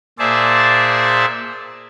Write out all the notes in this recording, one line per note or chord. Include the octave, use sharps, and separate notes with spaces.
A#2 G#4 C5 D5 E5 A5